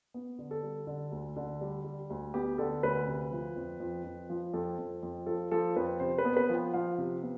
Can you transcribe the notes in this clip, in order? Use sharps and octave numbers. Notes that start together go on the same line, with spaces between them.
B3
D3
A4
G3
D3
D2
D3
G3
G3
D2
B3 G4
D3 A4
D2 B4
C3
F3
F2
F2
F2
F3
F2 A4
F2
F2
F3 A4
F3 A4
F2 B4
C3 C5
B4
B3
C5
B4
F3
G5
F3 F5
C3
B3